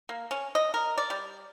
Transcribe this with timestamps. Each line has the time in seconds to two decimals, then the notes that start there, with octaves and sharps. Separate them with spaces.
0.09 A#3
0.31 C#4
0.55 D#5
0.74 A#4
0.98 D5
1.10 G3